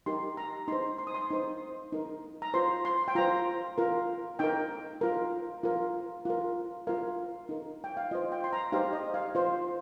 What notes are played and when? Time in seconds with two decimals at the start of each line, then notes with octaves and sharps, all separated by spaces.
0.06 D#4 G4 A#4 C6
0.37 A#5
0.68 D#4 C5 C6
0.98 C6
1.07 D#6
1.15 C6
1.31 D#4 C5
1.92 D#4 A#4
2.42 A#5
2.54 F4 C5 C6
2.85 C6
3.08 G5
3.15 F4 C5 A#5
3.78 F4 A#4
4.39 D#4 A#4 G5
5.01 F4 A#4
5.63 F4 A#4
6.25 F4 A#4
6.87 F4 A#4 F5
7.49 D#4 A#4
7.84 G5
7.97 F5
8.11 F4 C5 D#5
8.32 G5
8.44 C6
8.53 A#5
8.72 D#4 G4 C5 F5
8.93 D#5
9.14 F5
9.35 F4 C5